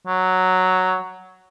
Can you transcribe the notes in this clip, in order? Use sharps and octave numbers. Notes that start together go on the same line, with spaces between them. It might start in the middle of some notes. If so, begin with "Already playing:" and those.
F#3